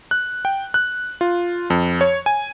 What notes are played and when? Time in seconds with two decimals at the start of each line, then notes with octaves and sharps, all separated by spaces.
0.11 F#6
0.45 G5
0.74 F#6
1.21 F4
1.70 F2
2.01 C#5
2.26 G#5